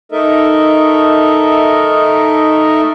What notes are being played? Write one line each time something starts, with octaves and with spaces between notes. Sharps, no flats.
A3 D#4 A4 A#4 D#5 E5